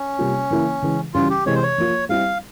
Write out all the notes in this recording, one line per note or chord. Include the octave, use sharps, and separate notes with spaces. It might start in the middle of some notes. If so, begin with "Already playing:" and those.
Already playing: C#4
C3 G3 A#3 F4
C#3 E3 A#3 E4
C#3 E3 G#3
C#3 E3 G3 C#4 F4
G4
C3 E3 G#3 C4 C#5
C5
C#5
F3 A#3 F4
G3 C4 E4 G4 F5